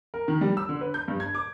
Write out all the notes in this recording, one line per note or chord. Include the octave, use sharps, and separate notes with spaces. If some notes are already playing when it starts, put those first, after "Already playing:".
A#4
D#3
G3
E6
D3
B4
G6
G2
G#6
D6